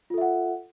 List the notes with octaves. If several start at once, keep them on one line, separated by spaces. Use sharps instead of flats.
F4 A4 E5 F#5